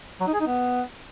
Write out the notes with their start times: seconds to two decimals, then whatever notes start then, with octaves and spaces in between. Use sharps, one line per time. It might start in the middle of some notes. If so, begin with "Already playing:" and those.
0.20 F#3
0.27 D#4
0.34 G#4
0.40 D#4
0.47 B3